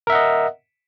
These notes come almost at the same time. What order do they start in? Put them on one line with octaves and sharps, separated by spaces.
A#4 E5 F#5 D#5